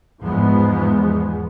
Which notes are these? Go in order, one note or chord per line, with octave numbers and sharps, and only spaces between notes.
E2 G#2 F3 G#3 B3